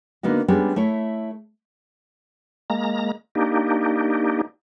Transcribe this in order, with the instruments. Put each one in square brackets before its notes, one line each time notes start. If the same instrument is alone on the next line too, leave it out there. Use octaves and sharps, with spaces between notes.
[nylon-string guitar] D3 A#3 B3 D#4 F#4
G3 G#3 B3 C#4 D4 G4
A3 E4 C#5
[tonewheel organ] G#3 A#3 A#5
A#3 D4 D#4 G4